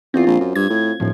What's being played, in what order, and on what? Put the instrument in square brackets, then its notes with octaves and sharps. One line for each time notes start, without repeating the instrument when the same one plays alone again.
[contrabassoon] E2 [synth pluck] C4 F4
[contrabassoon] A#1
F#2
[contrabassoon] G2 [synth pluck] G#6
[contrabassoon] A2
[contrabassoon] D#1 [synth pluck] A2 F3